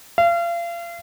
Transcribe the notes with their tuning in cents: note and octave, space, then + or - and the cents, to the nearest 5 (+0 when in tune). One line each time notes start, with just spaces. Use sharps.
F5 -35